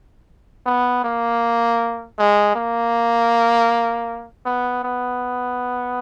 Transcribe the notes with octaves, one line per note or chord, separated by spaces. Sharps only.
B3
A#3
G#3
A#3
B3
B3